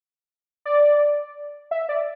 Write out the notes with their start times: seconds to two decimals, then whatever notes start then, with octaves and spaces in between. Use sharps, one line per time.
0.65 D5
1.71 E5
1.89 D5